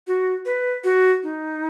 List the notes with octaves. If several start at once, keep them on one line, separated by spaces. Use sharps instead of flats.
F#4
B4
F#4
D#4